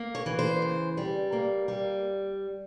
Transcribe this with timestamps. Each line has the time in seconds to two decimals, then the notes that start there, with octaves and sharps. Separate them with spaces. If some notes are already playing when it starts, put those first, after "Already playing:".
Already playing: A#3
0.15 C#5
0.26 E3
0.39 C5
0.62 C#3
0.97 G3
1.33 A#3
1.68 G3